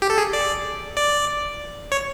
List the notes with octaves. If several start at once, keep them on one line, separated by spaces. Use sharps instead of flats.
G4
A4
G#4
D5
D5
C#5